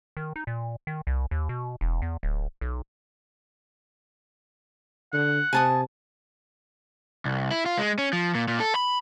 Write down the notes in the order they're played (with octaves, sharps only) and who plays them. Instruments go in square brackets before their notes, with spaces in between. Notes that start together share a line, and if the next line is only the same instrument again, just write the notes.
[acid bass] D#3
D#4
A#2
D#3
C2
D#2
B2
E1
E2
D1
B1
[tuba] D3 [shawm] F#5
[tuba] C3 [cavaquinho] G#5 A5 D#6
[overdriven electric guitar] C2
E4
F4
G#3
C#4
F3
A#2
A#2
A4
B5